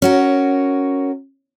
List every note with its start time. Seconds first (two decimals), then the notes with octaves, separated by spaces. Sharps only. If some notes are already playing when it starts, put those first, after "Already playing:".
0.02 C#4 F#4 A#4